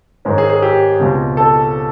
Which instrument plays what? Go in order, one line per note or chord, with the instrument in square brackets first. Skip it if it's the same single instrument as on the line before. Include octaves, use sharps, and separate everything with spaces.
[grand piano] G#2 D#3 G#3 C#4
G#4
G#4
G4
C#2 B2 G#3 C4
A4